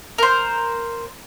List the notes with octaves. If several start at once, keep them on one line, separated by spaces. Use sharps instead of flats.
A#4 C5